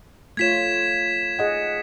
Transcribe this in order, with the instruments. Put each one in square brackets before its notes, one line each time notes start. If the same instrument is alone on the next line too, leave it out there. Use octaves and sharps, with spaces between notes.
[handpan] A3 F4 C#5 [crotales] G#6 B6 E7
[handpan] G#4 D#5 F#5